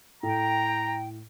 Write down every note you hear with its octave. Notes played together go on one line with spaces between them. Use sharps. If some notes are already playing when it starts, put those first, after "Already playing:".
A2 G5 A#5